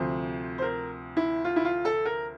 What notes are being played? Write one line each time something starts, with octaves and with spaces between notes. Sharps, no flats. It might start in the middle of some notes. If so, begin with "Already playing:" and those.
Already playing: D2 C3 F3 C5
C5
A#4
E4
F4
E4
F4
A4
A#4